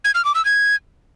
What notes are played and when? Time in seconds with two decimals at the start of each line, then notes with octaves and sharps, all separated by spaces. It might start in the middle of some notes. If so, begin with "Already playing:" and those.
0.05 G#6
0.15 F6
0.25 D6
0.35 E6
0.45 G#6